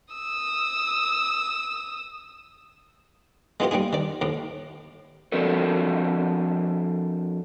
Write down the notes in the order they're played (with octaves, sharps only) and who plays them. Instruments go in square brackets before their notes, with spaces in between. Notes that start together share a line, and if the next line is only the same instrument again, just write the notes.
[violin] D#6 E6
[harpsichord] G#3 B3 E4 F4 G4 A#4
G3 A#3 D#4 G#4
D#3 D5
D#2 A2
[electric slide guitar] F3 C4 D4 F#4 A4 A#4